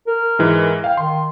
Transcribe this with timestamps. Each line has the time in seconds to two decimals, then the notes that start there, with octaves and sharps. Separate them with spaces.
0.07 A#4
0.39 G#2 E3 G#3
0.84 F5 G5
0.97 D#3 C6